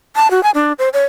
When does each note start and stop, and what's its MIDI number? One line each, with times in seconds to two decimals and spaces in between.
0.16 0.30 81
0.31 0.42 66
0.43 0.50 80
0.55 0.73 62
0.79 0.89 72
0.93 1.05 73